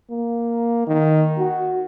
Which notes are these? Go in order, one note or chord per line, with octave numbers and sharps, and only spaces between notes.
A#3
D#3
F#4